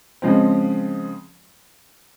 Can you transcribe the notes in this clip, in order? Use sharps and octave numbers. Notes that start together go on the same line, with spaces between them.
C#3 F3 G#3 C4